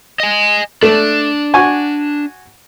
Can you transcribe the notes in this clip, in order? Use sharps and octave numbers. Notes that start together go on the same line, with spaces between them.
D#5 G#5
A3 D4
F#4 G#5 C#6